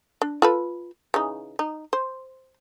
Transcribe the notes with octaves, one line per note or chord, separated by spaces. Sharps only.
D4
F4 A4 B4
C#3 E3 D#4
D#4
C5